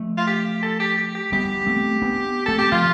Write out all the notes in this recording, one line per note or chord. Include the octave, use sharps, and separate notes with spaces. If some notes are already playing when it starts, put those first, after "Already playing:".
Already playing: F3 A3
F4
G4
A4
G4
G4
G4
G3 B3 G4
A3 C4
B3 D4
A3 C4 A4
G4
F3 A3 F4